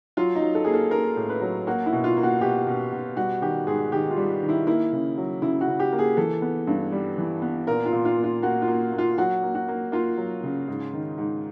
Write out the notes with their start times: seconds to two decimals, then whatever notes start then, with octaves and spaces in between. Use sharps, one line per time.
0.17 F#3 F4
0.35 D#4
0.41 F#3
0.55 A4
0.64 A#3 G#4
0.73 A4
0.91 A#3 A#4
1.16 A2
1.29 B4
1.41 F#3
1.67 A#3 F#4
1.86 E4
1.92 B2
2.04 F4
2.17 A#3
2.23 F#4
2.41 B2 G4
2.67 B2
2.93 B2
3.17 G3 F#4
3.42 D#3 G4
3.67 G#2 G#4
3.92 D#3 G4
4.11 F4
4.17 G3
4.42 D#3
4.49 E4
4.67 A#3 E4
4.93 C#3
5.18 F#3
5.42 C#3 E4
5.61 F#4
5.67 C#3
5.80 G4
5.92 A#3
5.99 G#4
6.17 E3 A4
6.42 B3
6.67 G2
6.92 G3
7.18 E3
7.42 B3
7.67 A#2 A#4
7.86 F4
7.92 A#2
8.05 F4
8.17 A#3
8.24 F4
8.43 A#3 F#4
8.62 F4
8.68 A#3
8.92 A#3
8.98 F4
9.18 F#3 F#4
9.43 A#3
9.55 F#4
9.68 A#3
9.92 A#3 F4
10.17 F#3
10.43 C#3
10.68 G#2
10.93 D#3
11.18 G#2